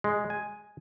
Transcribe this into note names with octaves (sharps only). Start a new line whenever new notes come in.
G#3
G#5